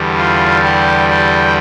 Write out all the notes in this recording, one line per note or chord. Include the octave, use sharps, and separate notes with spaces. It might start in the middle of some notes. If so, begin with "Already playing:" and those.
Already playing: E2 D3 G3
F4
G4
G4